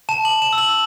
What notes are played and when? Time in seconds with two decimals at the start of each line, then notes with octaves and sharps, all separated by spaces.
0.09 A5 E7
0.25 F#7
0.31 A5
0.42 E7
0.53 E6
0.58 F#7